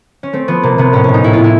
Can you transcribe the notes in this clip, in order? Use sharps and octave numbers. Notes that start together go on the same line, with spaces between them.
C#4
A3 C4
F3 B3
C3 A#3
C3 B3
A2 C#4
A2 C#4
D#4
A2 E4
F4
A2
E4